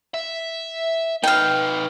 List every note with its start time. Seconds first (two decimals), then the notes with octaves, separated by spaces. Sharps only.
0.14 E5
1.24 D#4 B4 F5 G5